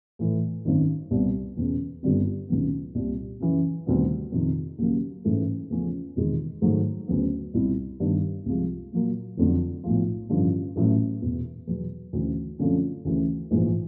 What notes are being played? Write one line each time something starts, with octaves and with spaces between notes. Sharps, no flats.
A2 E3 A3
G#1 F#2 D#3
C2 B2 G3 B3
E1 E2 C#3
G1 G2 D3 G3 C4
C#2 C3 D#3 F#3 B3
C2 A#2 G3
F#2 C#3 E3
D2 C3 D#3 G3 B3
F2 C3 D#3
D#2 C#3 F#3 A#3
A1 G#2 E3 A3
E2 C#3 F3 A3 C#4
E1 E2 C3 D#3 G#3
G#2 D#3 F#3 A3
D2 C#3 F#3 B3
C2 B2 G3 C4 E4
G2 D#3 G3 B3 D4
C2 C3 F3 G#3
A#2 F#3 A#3
F1 F2 D3 F#3
B1 A2 F3
A1 G2 D3 F3
A1 A2 F#3
E1 E2 B2
E2 B2 F#3
D2 C#3 E3
F#2 D3 F3 A3 C4
D2 C#3 E3 A3
A#1 G#2 E3